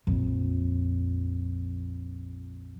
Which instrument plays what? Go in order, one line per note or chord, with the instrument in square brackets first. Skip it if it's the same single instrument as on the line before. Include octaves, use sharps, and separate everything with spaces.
[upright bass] A#1 F2